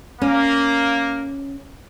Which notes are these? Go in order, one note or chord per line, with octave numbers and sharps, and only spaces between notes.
A#3 C#4